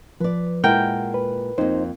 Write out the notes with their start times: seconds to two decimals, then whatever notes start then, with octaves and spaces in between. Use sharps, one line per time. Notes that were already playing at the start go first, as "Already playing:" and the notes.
0.20 F3 B4 D5
0.64 A#2 G#3 E4 A#4 F#5 G5
1.14 B4
1.58 F2 A#3 D#4 C5